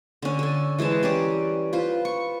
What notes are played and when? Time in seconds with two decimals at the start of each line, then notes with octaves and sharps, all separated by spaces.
0.22 D3 C#4
0.39 A4 G#5
0.78 E3 G#3 C5 A5
1.03 G3 C#4 A#4 D5
1.73 F4 B4 C5
2.05 C#6